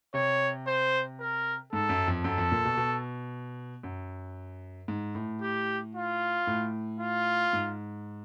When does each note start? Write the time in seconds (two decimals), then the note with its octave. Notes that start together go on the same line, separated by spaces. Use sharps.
0.14 C3 C#5
0.67 C5
1.20 A#4
1.72 G#2 A4
1.89 F#2
2.08 F2
2.24 F#2 A4
2.38 F2
2.52 A#2
2.65 B2
2.77 B2
3.83 F#2
4.88 G#2
5.15 A2
5.41 G4
5.95 F4
6.47 A2
7.00 F4
7.53 G#2